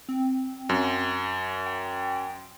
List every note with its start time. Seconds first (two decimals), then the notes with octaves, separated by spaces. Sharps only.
0.09 C4
0.69 F#2
1.66 G5